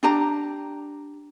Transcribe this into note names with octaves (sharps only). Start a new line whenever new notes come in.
D4 G4 A#5